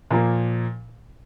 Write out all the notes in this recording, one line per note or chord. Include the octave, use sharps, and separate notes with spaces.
A#2 F3 A#3